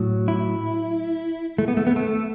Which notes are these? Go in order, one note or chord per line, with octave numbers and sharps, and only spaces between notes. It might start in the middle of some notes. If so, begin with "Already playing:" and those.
Already playing: A2 F#3
E4
A3
B3
A3
B3
A3